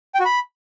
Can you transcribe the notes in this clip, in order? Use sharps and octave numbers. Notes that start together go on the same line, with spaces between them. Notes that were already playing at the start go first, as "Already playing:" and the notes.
G5
F#4
B5